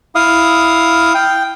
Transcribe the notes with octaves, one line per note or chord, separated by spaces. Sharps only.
E4 F5 D#6
G5